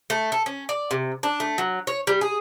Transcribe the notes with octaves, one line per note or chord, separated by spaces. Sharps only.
A3
A4
C#4
D5
C3
D4
A3
F#3
C#5
G3
G#4